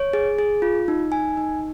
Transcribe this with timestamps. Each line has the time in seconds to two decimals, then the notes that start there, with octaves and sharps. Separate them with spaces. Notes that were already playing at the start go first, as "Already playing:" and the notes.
Already playing: C#5
0.13 G#4
0.38 G#4
0.62 F4
0.88 D#4
1.12 G#5
1.37 D#4